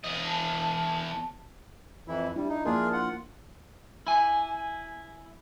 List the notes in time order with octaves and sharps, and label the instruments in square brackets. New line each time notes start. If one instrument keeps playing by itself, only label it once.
[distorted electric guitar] E2 D#5
[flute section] A5
[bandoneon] F2 E3 E4
[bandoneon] G3 [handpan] D4 E4
[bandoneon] D#4
[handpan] F3 A#3 A#4 [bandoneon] D4 F4 G#4
[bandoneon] F4 F#5
[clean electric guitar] E4 G#5